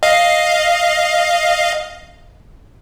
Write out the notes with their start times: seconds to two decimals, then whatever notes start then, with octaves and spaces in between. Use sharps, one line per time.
0.03 D#5 F5